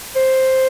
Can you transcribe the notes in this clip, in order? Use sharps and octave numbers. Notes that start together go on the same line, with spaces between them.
C5